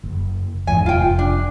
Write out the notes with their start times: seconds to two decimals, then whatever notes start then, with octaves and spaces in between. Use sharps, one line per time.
0.04 F#1
0.67 E2 G#2 G#5
0.86 F1 F4 G5
1.19 D4